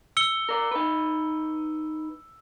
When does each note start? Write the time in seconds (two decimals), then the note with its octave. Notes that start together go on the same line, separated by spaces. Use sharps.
0.17 E6 C#7 G7
0.49 A#4 D5
0.71 D#4 B4